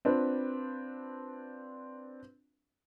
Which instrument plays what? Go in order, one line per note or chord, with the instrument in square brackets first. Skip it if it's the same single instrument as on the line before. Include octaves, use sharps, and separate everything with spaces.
[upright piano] C4 D4 F4 B4